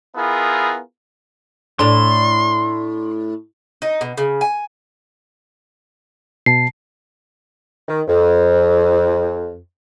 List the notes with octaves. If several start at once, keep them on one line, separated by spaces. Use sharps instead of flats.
B3 E4 F4 G#4 A#4
A2 D4 C6
D#4
B2
C#3
G#5
B2 A5 C7
D#3
F2